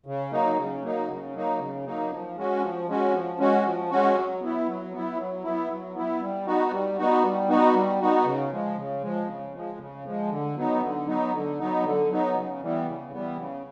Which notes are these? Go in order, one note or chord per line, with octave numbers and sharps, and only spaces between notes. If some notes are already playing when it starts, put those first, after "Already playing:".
C#3
F#3 A#3 D#4
C#3
F#3 A#3 D#4
C#3
F#3 A#3 D#4
C#3
F#3 A#3 D#4
F3
G#3 C#4 F#4
F3
G#3 C#4 F#4
F3
G#3 C#4 F#4
F3
G#3 C#4 F#4
F#3
B3 E4
F#3
B3 E4
F#3
B3 E4
F#3
B3 E4
G3
B3 D#4 F#4
G3
B3 D#4 F#4
G3
B3 D#4 F#4
G3
B3 D#4 F#4
C#3
F3 G#3
C#3
F3 G#3
C#3
F3 G#3
C#3
F3 G#3
D3
F#3 B3 D#4
D3
F#3 B3 D#4
D3
F#3 B3 D#4
D3
F#3 B3 D#4
C#3
E3 G3 B3
C#3
E3 G3 B3
C#3